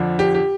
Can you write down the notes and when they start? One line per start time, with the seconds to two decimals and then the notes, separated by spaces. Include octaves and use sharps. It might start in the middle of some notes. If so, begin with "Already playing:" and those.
Already playing: F2 D3 F3
0.19 G4
0.35 G4